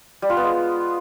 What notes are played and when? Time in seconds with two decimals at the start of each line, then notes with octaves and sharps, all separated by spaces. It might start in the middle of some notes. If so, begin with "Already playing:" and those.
0.22 G3
0.30 F4
0.37 B3
0.44 G#3